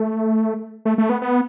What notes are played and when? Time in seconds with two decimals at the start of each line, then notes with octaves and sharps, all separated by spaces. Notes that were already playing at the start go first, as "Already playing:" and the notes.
Already playing: A3
0.85 A3
0.98 A3
1.09 B3
1.22 B3